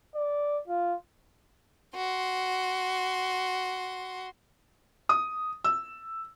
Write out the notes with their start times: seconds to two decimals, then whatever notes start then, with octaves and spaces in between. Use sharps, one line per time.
0.15 D5
0.68 F4
1.94 F#4 C6
5.09 D#6
5.64 E6